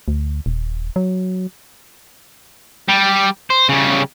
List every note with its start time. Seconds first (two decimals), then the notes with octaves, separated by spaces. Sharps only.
0.08 D2
0.46 D#1
0.96 F#3
2.88 G3
3.50 C5
3.69 C#3 G3